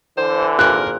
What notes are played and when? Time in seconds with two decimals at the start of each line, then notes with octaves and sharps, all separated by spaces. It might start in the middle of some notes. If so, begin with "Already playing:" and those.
0.17 D3 E3 C5
0.59 G#1 A#2 A#4 F#6